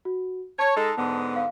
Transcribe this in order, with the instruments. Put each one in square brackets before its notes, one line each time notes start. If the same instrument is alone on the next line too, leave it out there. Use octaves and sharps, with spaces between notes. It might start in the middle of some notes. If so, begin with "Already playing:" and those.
[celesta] F#4
[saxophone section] C#5 [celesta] A5
[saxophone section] G#3 D#4 A4
G#2 D3 B3
[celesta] F5